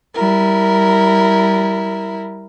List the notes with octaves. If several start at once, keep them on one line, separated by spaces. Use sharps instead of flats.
G3 E4 A#4